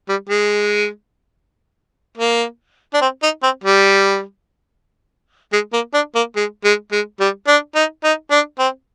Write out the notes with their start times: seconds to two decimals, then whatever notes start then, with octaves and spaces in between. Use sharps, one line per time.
0.09 G3
0.29 G#3
2.17 A#3
2.94 D4
3.01 C4
3.23 D#4
3.43 C4
3.64 G3
5.53 G#3
5.73 A#3
5.94 D4
6.15 A#3
6.36 G#3
6.64 G#3
6.92 G#3
7.20 G3
7.48 D4
7.75 D#4
8.04 D#4
8.31 D4
8.59 C4